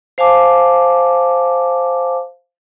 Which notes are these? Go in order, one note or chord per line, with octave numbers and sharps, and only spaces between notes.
C5 F5 G#5 A5 D6